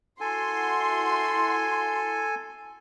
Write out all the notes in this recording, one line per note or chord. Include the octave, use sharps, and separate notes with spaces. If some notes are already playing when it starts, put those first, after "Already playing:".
E4 F#4 A4 G#5 C6